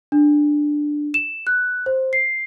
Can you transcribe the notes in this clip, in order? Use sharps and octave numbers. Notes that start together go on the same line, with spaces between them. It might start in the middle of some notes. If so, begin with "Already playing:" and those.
D4
E7
F#6
C5
C7